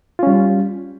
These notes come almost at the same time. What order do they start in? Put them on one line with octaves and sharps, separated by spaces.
F4 C#4 G3